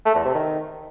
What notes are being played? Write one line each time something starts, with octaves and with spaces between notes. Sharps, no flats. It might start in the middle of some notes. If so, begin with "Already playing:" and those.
A3
E2
C3
D#3